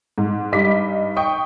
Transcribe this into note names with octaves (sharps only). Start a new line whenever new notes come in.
G#2
G2 G3 D#4 D6 B6
G5 C#6 D#6